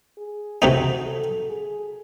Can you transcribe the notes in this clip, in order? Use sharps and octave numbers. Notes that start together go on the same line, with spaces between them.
G#4
C3 E3 A3 C4 D#4 F#4
A4
G#4